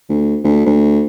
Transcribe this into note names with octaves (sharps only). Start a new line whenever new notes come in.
D2
D2
D2